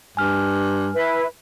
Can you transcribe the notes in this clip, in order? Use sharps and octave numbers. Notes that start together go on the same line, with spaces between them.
G2 G#5 F6
E4 B4